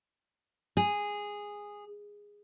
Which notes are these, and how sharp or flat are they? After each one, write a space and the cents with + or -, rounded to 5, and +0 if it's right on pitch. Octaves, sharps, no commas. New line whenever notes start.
G#4 -10